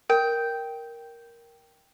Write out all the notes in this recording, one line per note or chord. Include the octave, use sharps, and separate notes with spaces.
A#4 G5